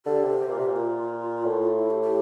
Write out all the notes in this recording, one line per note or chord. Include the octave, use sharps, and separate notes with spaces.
D3 G4
C3
C3
A#2
C3
A#2
F4
A2
E4
G4
G4